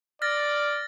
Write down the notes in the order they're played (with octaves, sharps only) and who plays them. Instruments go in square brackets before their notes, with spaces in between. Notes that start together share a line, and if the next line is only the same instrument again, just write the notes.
[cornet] D5 [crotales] F6 A6 A#6